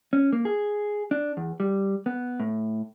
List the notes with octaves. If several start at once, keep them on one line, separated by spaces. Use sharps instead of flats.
C#4
A#3
G#4
D4
E2
G3
B3
A2